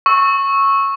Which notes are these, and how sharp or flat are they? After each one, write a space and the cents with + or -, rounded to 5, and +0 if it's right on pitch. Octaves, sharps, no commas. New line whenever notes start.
C#6 -10 E6 -5